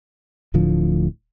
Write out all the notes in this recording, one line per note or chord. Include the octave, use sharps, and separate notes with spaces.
D1 A2 D3 F3